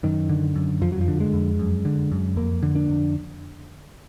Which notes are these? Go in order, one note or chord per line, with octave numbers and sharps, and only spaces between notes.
F#2 D#3
D3
F#2
F2 F3
F#3
F3
D3
G#3
F2
F#2
D3
F#2
F2 A#3
D3
D4
F2